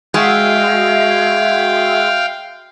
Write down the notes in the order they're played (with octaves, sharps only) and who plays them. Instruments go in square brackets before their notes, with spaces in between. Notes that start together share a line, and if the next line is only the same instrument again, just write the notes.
[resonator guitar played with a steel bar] G#3 [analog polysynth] F#4 E5 [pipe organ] F5 G5